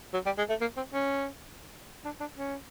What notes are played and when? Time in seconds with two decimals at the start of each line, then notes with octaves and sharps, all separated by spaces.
0.14 F#3
0.26 G3
0.38 G#3
0.49 A3
0.61 A#3
0.77 C4
0.93 C#4
2.05 D4
2.20 D4
2.36 C#4